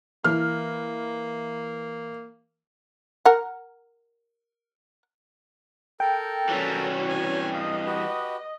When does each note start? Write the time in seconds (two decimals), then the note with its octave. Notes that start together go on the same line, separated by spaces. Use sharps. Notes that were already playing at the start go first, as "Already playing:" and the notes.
0.24 E3 A#3 F6
3.25 A#4 F#5
6.00 A4 A#4 G5
6.49 E3 G3 C#4 F#4 C#5
7.08 G#5
7.53 D#5 F5
7.86 F#4 G4 B4